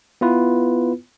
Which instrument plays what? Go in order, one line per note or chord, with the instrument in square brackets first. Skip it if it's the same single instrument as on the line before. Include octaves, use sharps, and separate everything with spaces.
[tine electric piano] B3 E4 F4 B4